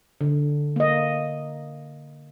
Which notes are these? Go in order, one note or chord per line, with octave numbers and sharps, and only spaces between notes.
D3
A#3 D#5